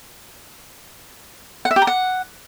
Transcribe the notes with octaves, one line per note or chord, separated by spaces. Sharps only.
F#5
E5
G4
A#5
F#5